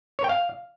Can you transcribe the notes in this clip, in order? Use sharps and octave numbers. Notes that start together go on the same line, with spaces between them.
C#5
G5
F5